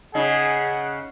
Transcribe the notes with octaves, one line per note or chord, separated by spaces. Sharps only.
C#3 D#4 G#4 D#5 F#5